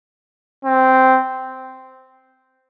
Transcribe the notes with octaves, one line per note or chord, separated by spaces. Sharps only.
C4